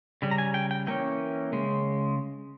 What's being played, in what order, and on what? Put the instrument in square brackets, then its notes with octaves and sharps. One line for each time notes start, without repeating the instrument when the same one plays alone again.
[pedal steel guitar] C#3 G3
A#5
G#5
G5
G5
E3 A#3 C#4 G5
C#3 G#3